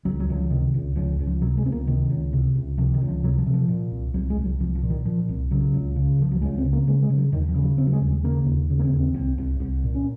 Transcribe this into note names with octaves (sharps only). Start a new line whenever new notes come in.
C#2 F#3
F#3
C#2 D#3
F3
C3 D#3
C#2
C#2 F3
C#2
F3
C3 F#3
G#3
C#2 C4
A#3
C3 D#3
C#2
C3
C#2
C3 F3
D#3
C#2
F3
C3 F#3
F3
C3
F3
A#2
C2
C2 F#3
G#3
C2
F#3
C2 F3
F3
A#2
D#3
A#2 F3
C2
C#3 F#3
C#2
C#3
C#2 F3
F#3
C#2 G#3
C4
C#3
A#3
C#3 G#3
G#3
C#3
F#3
D#2 D#3
F3
C#3 G#3
F#3
C#3 C4
F#3
G#3
D#2
G#3
C#3 A#3
D#2
C#3
A#3
C4
D#2
C4
C2
C2
C2
A#2
C#4